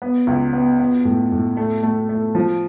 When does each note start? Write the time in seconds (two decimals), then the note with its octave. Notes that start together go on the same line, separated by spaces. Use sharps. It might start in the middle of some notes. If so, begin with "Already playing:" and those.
0.02 B3
0.27 C#2
0.53 B3
0.79 B3
1.05 A2
1.32 A2
1.57 A3
1.83 A3
2.09 A3
2.35 F3